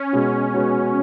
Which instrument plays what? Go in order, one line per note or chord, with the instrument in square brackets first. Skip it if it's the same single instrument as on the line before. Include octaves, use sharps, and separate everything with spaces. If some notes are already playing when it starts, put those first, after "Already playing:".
Already playing: [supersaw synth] C#4
[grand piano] B2 G#3 B3 F#4
G#3 B3 F#4